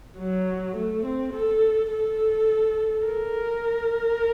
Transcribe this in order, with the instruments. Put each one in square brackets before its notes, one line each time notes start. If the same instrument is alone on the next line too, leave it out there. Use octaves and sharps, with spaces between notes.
[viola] F#3
A3
C4
A4
A4
A#4